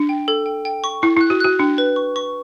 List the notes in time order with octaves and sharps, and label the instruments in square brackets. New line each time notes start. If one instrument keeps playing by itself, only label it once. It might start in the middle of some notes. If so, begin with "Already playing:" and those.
Already playing: [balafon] D4
[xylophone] G5
A4
G5
G5
C#6
[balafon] E4 [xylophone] C#6
[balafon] E4 [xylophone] F#6
[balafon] F#4
[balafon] F#4 [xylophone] F#6
[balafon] D4 [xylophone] G5
[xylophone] B4
C#6
C#6